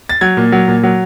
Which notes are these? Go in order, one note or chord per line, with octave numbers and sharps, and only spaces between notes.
A6
F#3 G#6
A#2
F#3
A#2
F#3